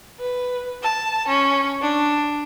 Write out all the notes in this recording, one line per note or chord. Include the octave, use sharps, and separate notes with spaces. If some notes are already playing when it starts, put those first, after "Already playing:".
B4
A5
C#4
D4